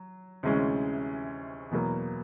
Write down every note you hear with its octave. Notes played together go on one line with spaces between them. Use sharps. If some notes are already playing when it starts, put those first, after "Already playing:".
Already playing: F#3
D2 C3 E3 G#3 C#4
E2 B2 F#3 A#3